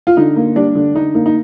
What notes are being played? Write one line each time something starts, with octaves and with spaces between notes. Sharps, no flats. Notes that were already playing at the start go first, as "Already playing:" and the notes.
F4
D3 D#4
A#3
G3 D4
D3
D3 D#4
A#3 D#4
D#4